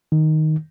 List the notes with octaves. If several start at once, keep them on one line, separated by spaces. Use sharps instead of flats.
D#3